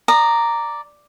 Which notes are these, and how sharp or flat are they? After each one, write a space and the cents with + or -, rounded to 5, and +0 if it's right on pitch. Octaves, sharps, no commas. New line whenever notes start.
D5 +0 A#5 -5 D#6 -30